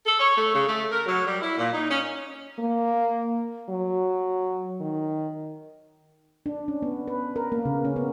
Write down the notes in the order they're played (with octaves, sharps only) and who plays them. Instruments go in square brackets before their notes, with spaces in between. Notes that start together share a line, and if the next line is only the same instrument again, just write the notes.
[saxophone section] A4
C#5
A3
C#3
A3
A#4
F#3
G3
E4
A#2
D#4
C#4
[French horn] A#3
F#3
D#3
[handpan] D4
C#4
B3
B4
A#4
A#3
C#3
C#4
B3